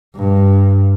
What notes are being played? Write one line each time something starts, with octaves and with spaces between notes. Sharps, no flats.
G2